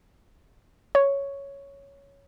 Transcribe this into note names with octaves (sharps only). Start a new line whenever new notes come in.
C#5